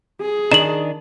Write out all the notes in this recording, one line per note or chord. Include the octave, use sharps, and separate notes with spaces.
G#4
D#3 D4 D#4 E7 F#7